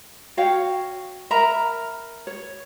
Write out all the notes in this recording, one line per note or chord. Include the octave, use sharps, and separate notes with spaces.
F#4 C#5 F5 G5
A#4 E5 A#5 B5
C#5